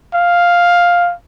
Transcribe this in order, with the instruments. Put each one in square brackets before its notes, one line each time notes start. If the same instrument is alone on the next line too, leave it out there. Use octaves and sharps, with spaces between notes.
[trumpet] F5